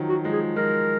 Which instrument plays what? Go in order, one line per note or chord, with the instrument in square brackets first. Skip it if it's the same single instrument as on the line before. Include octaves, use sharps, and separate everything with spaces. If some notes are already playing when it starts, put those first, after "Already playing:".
Already playing: [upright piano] D#3 F3 F#3
[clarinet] F#4
[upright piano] F3 G#3
[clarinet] G#4
[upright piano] F3 G#3 [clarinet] A#4